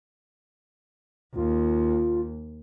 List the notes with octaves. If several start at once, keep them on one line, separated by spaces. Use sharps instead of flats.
D#2 F4